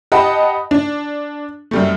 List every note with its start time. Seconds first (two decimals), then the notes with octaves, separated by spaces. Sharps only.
0.12 G4 D#5 F#5 A5 B5
0.71 D4
1.71 F#2 G3 A3